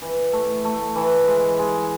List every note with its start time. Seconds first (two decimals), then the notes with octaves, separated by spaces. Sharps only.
0.02 E3
0.33 A3
0.65 A3
0.96 E3
1.28 G#3
1.59 G#3